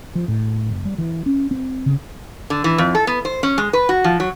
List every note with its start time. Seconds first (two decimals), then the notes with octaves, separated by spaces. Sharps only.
0.15 F3
0.28 A2
0.70 F#1
0.85 G3
0.98 E3
1.26 C#4
1.51 C4
1.86 C#3
2.50 D3
2.64 E3
2.78 F2
2.95 A4
3.07 B3
3.25 C5
3.43 C#4
3.58 G#3
3.73 B4
3.89 F#4
4.04 F3
4.20 F#3